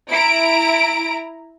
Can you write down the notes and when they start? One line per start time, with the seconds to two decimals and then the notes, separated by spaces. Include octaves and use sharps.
0.10 E4 A#5 D7